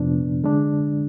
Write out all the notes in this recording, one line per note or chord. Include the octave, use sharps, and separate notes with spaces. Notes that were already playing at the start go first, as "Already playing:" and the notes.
Already playing: F2 C3 F3 B3 D4
D3 G#3 D4